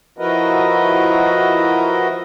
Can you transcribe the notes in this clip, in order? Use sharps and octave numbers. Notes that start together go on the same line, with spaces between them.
F3 E4 F#4 A#4 B4 D#5